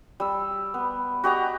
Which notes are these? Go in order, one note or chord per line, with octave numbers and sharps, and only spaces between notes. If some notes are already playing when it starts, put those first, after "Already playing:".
G3 E6
B3
F#4 G4 D#5 A#5